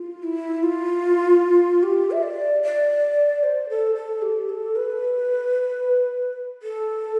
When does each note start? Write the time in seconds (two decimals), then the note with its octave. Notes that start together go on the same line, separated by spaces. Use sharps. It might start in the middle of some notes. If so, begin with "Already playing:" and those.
Already playing: F4
0.23 E4
0.63 F4
1.83 G4
2.11 E5
2.23 D5
2.63 D5
3.43 C5
3.69 A4
3.95 A4
4.22 G4
4.49 A4
4.76 B4
6.63 A4